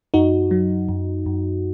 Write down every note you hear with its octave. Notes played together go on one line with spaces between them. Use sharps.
F#2 D#4 F#4
F#3
F#2
F#2